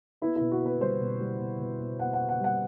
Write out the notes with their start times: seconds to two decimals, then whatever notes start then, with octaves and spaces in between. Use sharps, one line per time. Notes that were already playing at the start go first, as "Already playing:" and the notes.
0.22 B3 E4
0.36 B2 E4
0.52 F#4
0.60 B3
0.66 B4
0.80 G3 C5
1.01 B2
1.20 G3
1.39 B2
1.60 B2
1.80 B2
1.99 B3 F#5
2.13 F#5
2.18 B3
2.29 F#5
2.39 G3 F#5